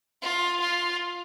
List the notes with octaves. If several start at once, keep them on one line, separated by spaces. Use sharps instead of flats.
F4
F4